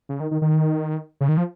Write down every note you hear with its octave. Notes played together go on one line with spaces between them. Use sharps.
C#3
D#3
D#3
D#3
C#3
D#3
F3